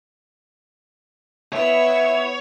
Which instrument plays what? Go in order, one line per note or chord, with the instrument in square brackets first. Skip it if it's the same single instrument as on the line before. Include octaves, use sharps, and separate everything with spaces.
[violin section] B3 E4 E6 [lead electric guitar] C#5 [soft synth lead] E5